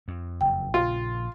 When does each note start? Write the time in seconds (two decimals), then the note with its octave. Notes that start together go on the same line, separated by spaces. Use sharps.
0.08 F2
0.41 F#1 F2 G5
0.74 A#1 A#2 C#3 F4